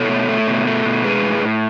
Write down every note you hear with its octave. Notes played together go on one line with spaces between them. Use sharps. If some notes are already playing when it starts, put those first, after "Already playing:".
Already playing: B2 A4 C#5
A3
A3
B2
A3
B2
G#3 G#4 B4
A2
A2